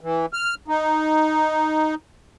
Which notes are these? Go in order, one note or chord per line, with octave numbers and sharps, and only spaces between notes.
E3
F6
D#4